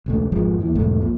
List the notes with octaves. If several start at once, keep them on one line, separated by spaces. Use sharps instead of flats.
E1 C#2 A3
G#1 F2 F3 G#3
D#2 E3
B1 E2 G#2 A3
A#1 A#2